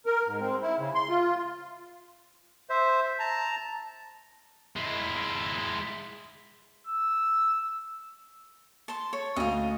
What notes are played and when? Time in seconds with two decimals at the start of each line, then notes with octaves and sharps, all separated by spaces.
0.06 A#4
0.27 G#2
0.40 C4
0.62 E4
0.79 C#3
0.95 C6
1.09 F4
2.70 C5 E5
3.19 A5 A#5
4.76 G#3 E4
6.87 E6
8.88 A5 C6
9.13 C#5
9.36 D2 D#5 F5